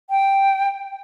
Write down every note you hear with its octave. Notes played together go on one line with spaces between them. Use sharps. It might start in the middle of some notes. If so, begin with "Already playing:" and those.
G5